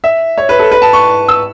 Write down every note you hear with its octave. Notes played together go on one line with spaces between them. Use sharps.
E5
C#5
B4
A4
B4
A5
C#6
E6